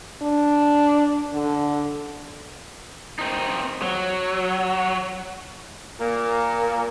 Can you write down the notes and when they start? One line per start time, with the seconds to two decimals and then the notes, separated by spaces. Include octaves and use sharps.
0.22 D4
1.33 D3
3.19 C4 D#4
3.82 F#3
5.99 A#2 A#3